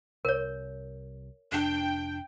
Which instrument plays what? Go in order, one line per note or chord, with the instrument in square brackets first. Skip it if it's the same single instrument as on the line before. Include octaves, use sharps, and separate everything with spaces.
[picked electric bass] C2 [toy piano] A#4 C#5
[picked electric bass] F1 [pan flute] D4 [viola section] G5